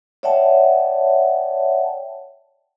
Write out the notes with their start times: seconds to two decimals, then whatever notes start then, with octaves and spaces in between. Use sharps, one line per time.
0.23 C#5 D5 E5 F#5 G5 A5